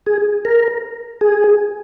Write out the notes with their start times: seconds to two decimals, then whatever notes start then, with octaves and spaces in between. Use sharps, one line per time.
0.06 G#4
0.45 A#4
1.21 G#4